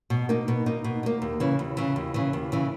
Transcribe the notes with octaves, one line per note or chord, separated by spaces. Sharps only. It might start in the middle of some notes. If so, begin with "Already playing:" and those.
B2
A#3 D#4
B2
A#3 D#4
B2
A#3 D#4
D#2
C#3 E3
D#2
C#3 E3
D#2
C#3 E3
D#2
C#3 E3